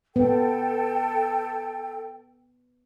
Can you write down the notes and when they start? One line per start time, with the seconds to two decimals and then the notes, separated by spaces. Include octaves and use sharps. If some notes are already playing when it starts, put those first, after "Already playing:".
0.16 B3 A4 G5